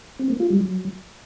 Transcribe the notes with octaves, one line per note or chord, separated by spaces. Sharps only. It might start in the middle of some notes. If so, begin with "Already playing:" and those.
C4
A#3
F4
G3
F#3